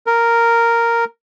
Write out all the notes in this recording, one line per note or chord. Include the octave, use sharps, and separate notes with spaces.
A#4